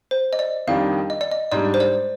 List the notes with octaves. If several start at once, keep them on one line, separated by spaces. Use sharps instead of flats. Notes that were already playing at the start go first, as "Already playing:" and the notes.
C5
D#5
D5
F2 D#3 G3 D4 F5
D#5
D5
D#5
G#2 G3 D4 D5
C5
D5